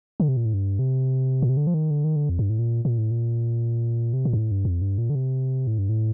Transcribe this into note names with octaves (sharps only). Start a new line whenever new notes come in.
D3
C3
A#2
A2
G2
C3
A#2
C3
D3
F3
D#3
D3
D#3
D3
F2
G2
A2
A#2
A#2
A2
A#2
C3
A#2
G2
A2
G2
F2
G2
A#2
D3
C3
A2
G2
A2